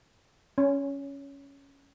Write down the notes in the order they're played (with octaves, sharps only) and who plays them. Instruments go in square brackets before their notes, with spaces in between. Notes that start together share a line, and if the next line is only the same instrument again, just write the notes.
[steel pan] C#4